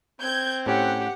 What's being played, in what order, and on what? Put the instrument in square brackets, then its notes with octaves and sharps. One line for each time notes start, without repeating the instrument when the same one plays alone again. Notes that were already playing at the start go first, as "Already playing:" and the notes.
[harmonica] C4 [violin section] G6 G#6
[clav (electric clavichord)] A2 C#4 [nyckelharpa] G4 [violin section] F#5